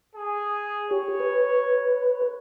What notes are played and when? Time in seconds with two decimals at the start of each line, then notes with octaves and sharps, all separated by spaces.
0.16 G#4
0.91 G4 C#5
1.20 B4